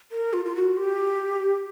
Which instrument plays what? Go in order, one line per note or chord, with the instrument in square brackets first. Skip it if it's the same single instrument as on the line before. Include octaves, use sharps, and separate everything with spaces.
[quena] A#4
F4
F4
F#4
G4